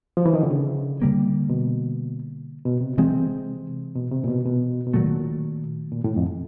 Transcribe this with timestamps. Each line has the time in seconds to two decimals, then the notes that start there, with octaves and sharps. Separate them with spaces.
0.17 F3
0.26 E3
0.34 D#3
0.43 D3
0.51 C#3
1.00 D3 G3 A#3 C#4
1.50 B2
2.65 B2
2.81 C3
2.97 C3 E3 G#3 C4
3.95 B2
4.11 C3
4.24 A#2
4.28 B2
4.45 B2
4.86 B2
4.94 A#2 D#3 F#3 A3
5.92 A#2
6.04 A2
6.16 F2